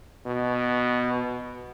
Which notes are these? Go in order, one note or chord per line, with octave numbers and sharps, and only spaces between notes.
B2